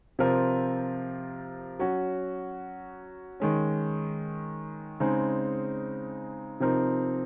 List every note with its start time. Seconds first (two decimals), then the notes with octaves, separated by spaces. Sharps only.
0.19 C3 F3 C4 F4 A#4
1.79 F#3 C#4 F#4
3.40 D#3 G#3 C#4
5.00 C#3 G#3 C4 D#4
6.60 C3 F3 C4 D#4 A#4